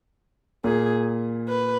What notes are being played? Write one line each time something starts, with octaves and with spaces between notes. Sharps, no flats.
A#2 G#4
B4